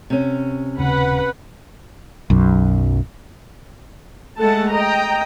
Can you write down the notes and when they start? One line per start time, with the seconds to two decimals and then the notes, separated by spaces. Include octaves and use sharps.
0.10 C3 C#4
0.78 D#1 C#3 B4 F#5 B5
2.30 B1 F#2
4.40 G#3 A3 A4 F#5 A5
4.72 D#5 G5 A#5